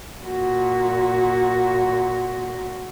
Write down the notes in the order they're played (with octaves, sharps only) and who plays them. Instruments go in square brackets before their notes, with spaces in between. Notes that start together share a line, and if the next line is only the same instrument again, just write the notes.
[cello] A#2 F#4